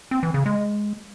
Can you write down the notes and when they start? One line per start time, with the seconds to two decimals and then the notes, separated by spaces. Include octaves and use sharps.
0.11 C4
0.23 E3
0.34 C#3
0.46 G#3